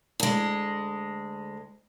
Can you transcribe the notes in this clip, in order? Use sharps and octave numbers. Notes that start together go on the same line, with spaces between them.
D2 G#3